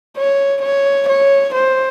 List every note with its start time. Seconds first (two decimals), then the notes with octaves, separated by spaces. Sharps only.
0.18 C#5
0.62 C#5
1.09 C#5
1.55 C5